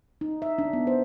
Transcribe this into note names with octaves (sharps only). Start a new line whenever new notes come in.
D#4
E5
D4
B3
C5